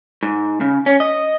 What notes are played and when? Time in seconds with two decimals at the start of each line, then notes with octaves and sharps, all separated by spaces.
0.23 G#2
0.61 C#3
0.86 C#4
1.00 D#5